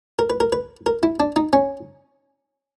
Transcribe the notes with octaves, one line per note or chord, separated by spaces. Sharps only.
A#4
B4
A#4
B4
A#4
E4
D4
D#4
C#4